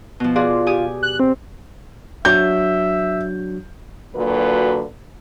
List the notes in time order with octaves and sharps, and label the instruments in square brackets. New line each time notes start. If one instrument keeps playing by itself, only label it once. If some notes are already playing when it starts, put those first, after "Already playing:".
[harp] B2 F3
[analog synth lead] F4 [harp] F#4 G#4 D5
[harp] G4 G#5 D#6
[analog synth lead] F#6
C4
[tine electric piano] F#3 D4 F#4 [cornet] E5 [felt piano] G6
[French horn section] A#2 D3 F#3 A#3 F#4 B4